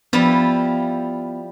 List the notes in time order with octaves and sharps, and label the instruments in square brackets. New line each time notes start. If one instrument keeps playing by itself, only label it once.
[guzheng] F3 G3 E4 [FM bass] B3